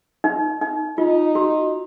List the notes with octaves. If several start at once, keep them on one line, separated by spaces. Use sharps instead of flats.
D#4
D#4
D#4 F4
F#4